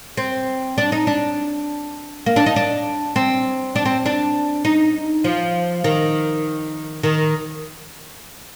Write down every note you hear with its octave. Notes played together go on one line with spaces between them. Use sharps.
C4
D4
D#4
D4
A#3
D4
D#4
D4
C4
D4
C4
D4
D#4
F3
D#3
D#3